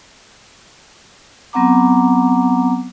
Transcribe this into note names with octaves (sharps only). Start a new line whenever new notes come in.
F#3 B3 C4 F#5 A#5 D6